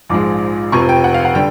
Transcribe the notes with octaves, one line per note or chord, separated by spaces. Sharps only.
A#1 G#2 F3 G#3 D6
F1 F2 C3 F3 C#6
G5
F#5
F5
F#5
D3 G3 G5